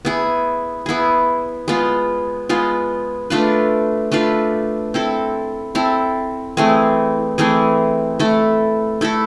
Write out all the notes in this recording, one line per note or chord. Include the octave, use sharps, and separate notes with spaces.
B3 E4 G#4
B3 E4 G#4
G#3 B3 F4
G#3 B3 F4
A3 D4 F4 B4
A3 D4 F4 B4
C4 E4 A4
C4 E4 A4
E3 A3 C4 G#4
E3 A3 C4 G#4
A3 E4 A4
A3 E4 A4